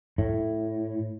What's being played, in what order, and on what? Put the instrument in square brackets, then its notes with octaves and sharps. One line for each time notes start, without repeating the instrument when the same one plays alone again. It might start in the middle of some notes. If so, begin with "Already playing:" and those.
[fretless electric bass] A2